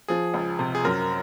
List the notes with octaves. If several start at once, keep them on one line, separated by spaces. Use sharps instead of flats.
F3 G#4
C#2
C3
G#4
F#2 A#4